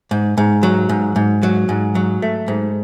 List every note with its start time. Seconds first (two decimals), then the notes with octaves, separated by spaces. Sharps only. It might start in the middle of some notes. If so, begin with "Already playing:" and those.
0.11 G#2
0.38 G#2
0.63 F#3
0.89 G#2
1.16 G#2
1.43 F#3
1.69 G#2
1.95 F#3
2.22 A3
2.48 G#2